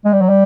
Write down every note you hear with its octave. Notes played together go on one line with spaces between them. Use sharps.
G#3
G3
F#3
G3